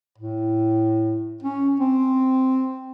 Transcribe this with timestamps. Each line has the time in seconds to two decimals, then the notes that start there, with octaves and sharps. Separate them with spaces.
0.18 A2
1.42 C#4
1.80 C4